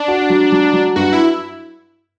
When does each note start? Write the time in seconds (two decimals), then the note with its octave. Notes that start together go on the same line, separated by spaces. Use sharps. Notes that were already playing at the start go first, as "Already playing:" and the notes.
Already playing: D4
0.08 F#4
0.30 F#3
0.52 F#3
0.74 F#3
0.96 G2 F#4
1.12 E4